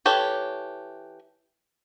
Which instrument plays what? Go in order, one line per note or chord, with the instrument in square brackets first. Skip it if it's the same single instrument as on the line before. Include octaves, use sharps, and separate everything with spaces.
[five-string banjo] E3 G4 A4 C#5